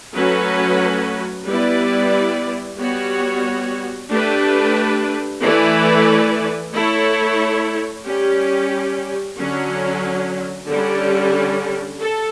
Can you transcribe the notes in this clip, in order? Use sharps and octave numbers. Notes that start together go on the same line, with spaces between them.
F#3 A3 C#4 F#4 B4
G3 B3 E4 B4 D5
G3 B3 F#4 C#5
A3 D4 G4 B4
E3 A3 E4 B4 D5
A3 E4 A4 C#5
G3 C#4 G4
D3 F#3 C#4
D3 G3 C#4
A4